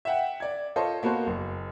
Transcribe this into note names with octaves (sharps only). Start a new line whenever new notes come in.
E5 F#5 G5
D5 G#6
F4 A4 C5 C#5 D#5
A#3 B3 F#4 A4 C5
F#1